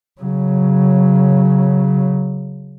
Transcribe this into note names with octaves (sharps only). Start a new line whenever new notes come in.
C#3 F#3